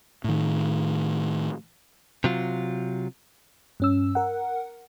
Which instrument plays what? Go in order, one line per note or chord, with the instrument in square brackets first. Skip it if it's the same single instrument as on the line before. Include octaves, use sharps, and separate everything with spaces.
[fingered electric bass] A2 D#3
[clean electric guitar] C3 F#3 F4
[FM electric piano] G2 C#4 E6
A#4 F#5